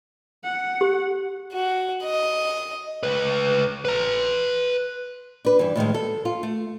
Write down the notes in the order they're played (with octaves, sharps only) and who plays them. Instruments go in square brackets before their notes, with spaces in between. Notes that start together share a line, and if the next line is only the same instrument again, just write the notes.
[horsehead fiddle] F#5
[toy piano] G4
[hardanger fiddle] F#4
D#5
[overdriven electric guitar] C#2 B4
B4 A#5
[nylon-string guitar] D4 B4
G2 E3
A2 D#3 F3 G#3
A4
F4
A3